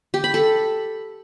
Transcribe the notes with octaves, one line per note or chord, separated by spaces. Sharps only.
G4
B5
A4